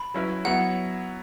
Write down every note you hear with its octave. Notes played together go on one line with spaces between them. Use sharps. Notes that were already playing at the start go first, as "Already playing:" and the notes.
Already playing: B5
F#3 C#4 E4 B4
F#3 B3 E4 F#5